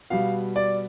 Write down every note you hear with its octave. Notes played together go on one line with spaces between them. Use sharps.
B2 G3 F5
D5